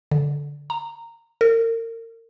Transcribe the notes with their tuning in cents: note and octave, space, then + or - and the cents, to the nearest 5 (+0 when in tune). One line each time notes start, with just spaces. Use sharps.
D3 -15
A#5 -15
A#4 -35